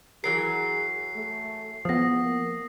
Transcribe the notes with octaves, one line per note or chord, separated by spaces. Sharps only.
E3 F#3 G#4 A#4 C7
A3
E2 F3 B3 D#6 A#6
A#3